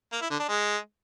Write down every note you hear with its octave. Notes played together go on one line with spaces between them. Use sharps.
A#3
E4
D3
D4
G#3